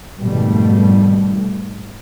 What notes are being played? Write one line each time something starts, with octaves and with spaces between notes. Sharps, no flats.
G#1 F2 B2 G3 A3